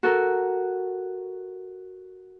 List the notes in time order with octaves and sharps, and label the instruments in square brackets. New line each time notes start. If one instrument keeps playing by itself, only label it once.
[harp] F#4 A4 A#4